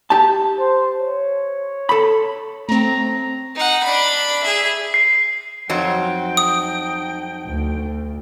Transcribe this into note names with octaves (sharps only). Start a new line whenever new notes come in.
G4 A5
C5
C#5
A4 B5
A3 C4 A#5
D#4 F#5
D4 B5
G#4 E5
C7
F2 F#3 D#4 G5
D#6
D2